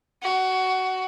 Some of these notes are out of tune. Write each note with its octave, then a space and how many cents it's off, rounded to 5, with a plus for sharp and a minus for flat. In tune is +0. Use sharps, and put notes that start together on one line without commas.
F#4 +15